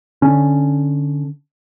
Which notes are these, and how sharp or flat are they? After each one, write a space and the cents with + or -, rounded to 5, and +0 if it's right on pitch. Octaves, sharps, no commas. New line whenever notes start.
D3 +0 C#4 +0